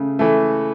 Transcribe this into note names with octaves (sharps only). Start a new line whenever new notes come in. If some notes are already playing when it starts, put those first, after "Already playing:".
Already playing: C#3 A3
E3 A3